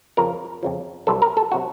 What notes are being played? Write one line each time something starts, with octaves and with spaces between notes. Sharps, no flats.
F2 C#3 F3 A#4
F2 C#3 F3
C2 C3 F#3 A4
A#4
A4
C3 F#3 F#4